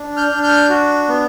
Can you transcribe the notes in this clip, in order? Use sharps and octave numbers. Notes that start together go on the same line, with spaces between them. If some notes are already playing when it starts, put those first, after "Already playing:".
Already playing: D4
F6 G6
D4
F6 G6
F#4
B3